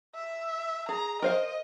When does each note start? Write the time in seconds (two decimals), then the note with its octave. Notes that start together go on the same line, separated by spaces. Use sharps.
0.15 E5
0.89 G#4 A#5
1.22 A#4 C5 D#5 F5